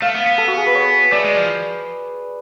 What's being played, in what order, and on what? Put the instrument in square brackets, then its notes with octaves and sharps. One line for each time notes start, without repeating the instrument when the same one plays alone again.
[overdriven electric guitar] A3 [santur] F5
[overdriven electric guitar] B3
B3
[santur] A4
F#4
G#4
B4
C#5
[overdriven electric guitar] A3 [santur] D5
[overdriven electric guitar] G#3
F3